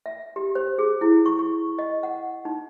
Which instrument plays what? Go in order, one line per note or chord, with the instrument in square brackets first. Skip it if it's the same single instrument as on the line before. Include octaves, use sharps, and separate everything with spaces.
[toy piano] E5
G4
C5
G#4
E4
C#6
C#6
D#5
F#5
D#4